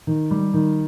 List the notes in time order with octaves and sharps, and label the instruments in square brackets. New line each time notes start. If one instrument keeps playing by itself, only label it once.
[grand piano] D#3
G3
D#3